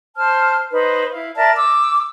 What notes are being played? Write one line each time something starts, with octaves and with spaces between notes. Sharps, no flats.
C5 A5 F6
D#4 B4 C5
E4 F5
A#4 D5 E5 A5
D6 E6